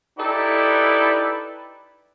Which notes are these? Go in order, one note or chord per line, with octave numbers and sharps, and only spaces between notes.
D#4 E4 G4 A4 B4 D5